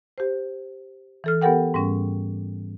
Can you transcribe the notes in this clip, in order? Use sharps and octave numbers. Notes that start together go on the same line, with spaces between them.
G4 C5
E3 A4 F6
B3 G4 A4 A#4 F#5 G5
G#2 G3 C#4